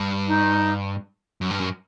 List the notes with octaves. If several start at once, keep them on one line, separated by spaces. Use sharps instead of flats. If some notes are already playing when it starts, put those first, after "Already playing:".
Already playing: G2
D#4
F#2
G2
F#2